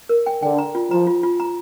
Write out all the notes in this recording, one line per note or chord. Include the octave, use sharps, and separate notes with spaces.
A#4
G5
D3 G5
A#5
F4
F3 A#5
F4
F4
A#5